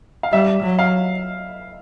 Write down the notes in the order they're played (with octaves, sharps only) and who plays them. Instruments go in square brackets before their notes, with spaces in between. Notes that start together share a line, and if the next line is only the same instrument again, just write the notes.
[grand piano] F5
[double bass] G3 [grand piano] E5
[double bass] F#3
[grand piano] F5